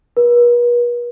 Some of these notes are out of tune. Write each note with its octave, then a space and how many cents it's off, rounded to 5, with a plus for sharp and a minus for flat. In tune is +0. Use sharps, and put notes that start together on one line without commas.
B4 -45